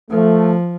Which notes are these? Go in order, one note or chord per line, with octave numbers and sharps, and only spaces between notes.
F3 A3